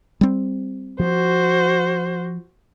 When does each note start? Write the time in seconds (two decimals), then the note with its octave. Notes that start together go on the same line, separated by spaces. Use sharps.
0.21 G3 C4
1.00 F3 F#4 C5